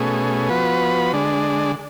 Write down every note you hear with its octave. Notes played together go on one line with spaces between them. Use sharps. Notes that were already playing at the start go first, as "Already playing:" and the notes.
Already playing: B2 A3 C#4 G#4
F3 B3 F#4 B4
D3 G#3 D4